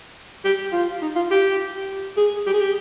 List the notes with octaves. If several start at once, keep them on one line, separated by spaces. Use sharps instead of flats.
G4
F4
D#4
F4
G4
G#4
G4
G#4
G4